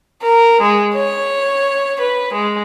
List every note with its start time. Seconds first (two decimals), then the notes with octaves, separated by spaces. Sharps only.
0.23 A#4
0.61 G#3
0.95 C#5
2.02 B4
2.33 G#3